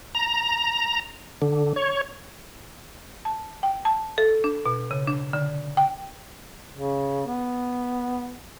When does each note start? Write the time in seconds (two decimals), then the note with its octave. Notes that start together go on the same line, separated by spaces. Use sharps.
0.15 A#5
1.42 D3
1.76 C#5
3.25 A5
3.63 G5
3.85 A5
4.18 A4
4.44 D4
4.66 B2
4.91 C#3
5.07 D4
5.33 D3
5.77 G5
6.73 C#3
7.27 B3